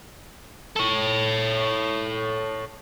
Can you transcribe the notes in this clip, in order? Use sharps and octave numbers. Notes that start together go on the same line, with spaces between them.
A4 C#5